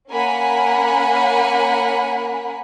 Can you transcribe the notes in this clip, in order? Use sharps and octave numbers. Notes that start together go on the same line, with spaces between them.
A#3 C#4 A#4 F#5 G#5 B5